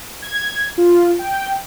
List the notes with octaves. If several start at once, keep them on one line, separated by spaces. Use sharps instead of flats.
G#6
F4
G5